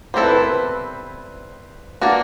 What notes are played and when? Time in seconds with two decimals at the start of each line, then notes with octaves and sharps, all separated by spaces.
0.14 G3 C4 E4 A4 C5
0.23 B4
0.32 A#4
0.40 B4
2.01 A#3 D4 F#4 B4